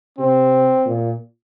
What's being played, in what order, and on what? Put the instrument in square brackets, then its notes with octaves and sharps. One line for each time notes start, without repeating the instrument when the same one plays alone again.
[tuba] C3 [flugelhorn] C4
[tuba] A#2